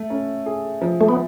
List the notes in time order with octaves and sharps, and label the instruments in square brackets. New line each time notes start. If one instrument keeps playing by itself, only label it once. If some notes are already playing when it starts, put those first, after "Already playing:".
Already playing: [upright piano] A3
C#4
G#4
F3
[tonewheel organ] A3
B3